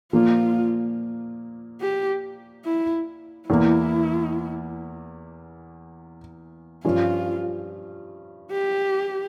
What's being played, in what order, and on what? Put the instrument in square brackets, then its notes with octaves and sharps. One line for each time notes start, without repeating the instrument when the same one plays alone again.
[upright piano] A#2 F3 A#3 [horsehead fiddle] F4
[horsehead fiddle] G4
E4
[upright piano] E2 E3 A#3 [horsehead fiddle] E4
[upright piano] G2 F3 C#4 [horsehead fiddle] F4
[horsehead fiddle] G4